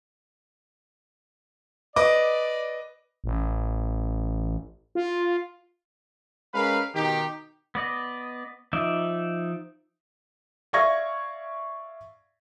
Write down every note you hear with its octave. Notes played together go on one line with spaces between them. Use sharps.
B4 D5 D#5 D6
A1
F4
G#3 C#4 A#4 B4 F5 B5
B2 D#3 D#4 G4
B3 D5 D#5
F3 D#4 D5 E5
D5 E5 F5 C#6 G#6 A#6